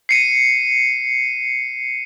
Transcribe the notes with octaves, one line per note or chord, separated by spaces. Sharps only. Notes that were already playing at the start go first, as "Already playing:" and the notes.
C7 C#7 D#7